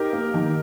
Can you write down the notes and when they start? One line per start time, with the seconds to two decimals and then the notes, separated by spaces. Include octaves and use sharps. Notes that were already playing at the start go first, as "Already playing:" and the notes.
Already playing: D#4 G4 A#4
0.13 A#3
0.34 D#3